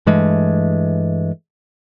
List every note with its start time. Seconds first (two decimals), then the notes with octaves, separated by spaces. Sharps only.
0.06 G2 E3 G#3 A3